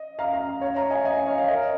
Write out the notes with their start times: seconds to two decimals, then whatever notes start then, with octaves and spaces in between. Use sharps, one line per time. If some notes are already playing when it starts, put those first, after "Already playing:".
Already playing: D#5
0.19 F5 A#5
0.33 F5 A#5
0.61 C#5 F5
0.76 F5 A#5
0.90 D#5 G#5
1.05 D#5 G#5
1.26 C#5 F5
1.38 C#5 F5
1.48 A#4 D#5